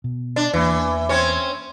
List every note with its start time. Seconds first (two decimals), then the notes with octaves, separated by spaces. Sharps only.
0.04 B2
0.36 D4
0.54 E2 E3 A#3
1.09 C4 C#4 C#5